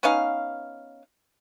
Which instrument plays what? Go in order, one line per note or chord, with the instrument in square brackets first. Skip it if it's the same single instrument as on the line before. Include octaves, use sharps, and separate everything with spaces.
[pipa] B3 C#4 D#4 F5